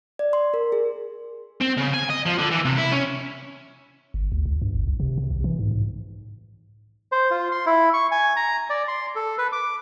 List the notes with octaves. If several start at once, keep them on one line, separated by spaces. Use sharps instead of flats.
D5
C6
A#4
G#4
C4
C#3
G#5
D#5
F3
D3
E3
C3
E4
C#4
G1
D2
C#2
G2
F#1
C2
C3
C3
B1
E3
G#2
G#2
C5
F4
C6
E4
C#6
G#5
A#5
D5
C6
A4
B4
D6